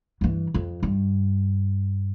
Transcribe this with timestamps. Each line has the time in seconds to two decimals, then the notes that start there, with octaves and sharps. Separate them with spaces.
0.21 G2 E3
0.54 F2
0.83 G2